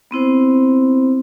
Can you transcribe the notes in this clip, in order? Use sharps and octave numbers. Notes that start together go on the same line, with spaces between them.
B3 C4 E4 C5